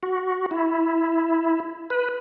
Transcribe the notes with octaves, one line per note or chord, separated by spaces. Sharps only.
F#4
E4
B4